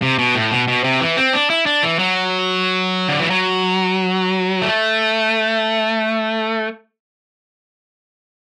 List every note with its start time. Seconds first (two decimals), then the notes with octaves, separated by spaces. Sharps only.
0.02 C3
0.18 B2
0.35 A2
0.52 B2
0.68 B2
0.84 C3
1.01 E3
1.17 C4
1.33 D4
1.50 E4
1.66 D4
1.83 E3
1.99 F#3
3.08 D3
3.19 E3
3.30 F#3
4.62 A3